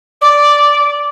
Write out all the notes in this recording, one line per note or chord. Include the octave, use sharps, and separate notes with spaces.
D5